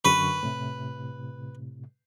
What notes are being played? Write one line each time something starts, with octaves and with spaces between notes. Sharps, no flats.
F#2 D3 B4 C#6
A2 C3